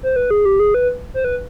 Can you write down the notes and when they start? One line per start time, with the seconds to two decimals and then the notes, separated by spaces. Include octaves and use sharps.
0.03 C5
0.16 B4
0.31 G#4
0.45 G4
0.59 G#4
0.74 B4
1.14 C5
1.25 B4